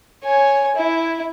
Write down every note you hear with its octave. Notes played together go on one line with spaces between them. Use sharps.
C#5 G#5
E4